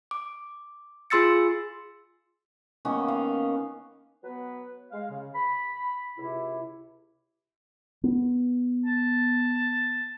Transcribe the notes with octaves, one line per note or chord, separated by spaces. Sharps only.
D6
F4 G#4 C6 E6 A6 C#7
D#3 A#3 B3 C#4
F5
F#3 B3 B4
G#3 F5
C#3
B5
C#2 C3 E4
B3
A5